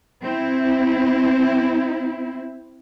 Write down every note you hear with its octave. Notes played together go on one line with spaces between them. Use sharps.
C4 E4